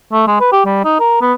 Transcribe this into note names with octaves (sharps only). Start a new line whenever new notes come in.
A3
G#3
B4
G4
G3
D#4
A#4
B3